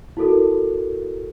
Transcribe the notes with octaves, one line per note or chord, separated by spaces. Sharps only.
E4 F#4 A4 A#4